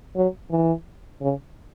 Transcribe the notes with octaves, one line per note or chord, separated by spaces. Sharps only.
F#3
E3
C#3